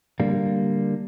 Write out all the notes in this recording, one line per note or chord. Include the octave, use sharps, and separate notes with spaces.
D3 G3 A#3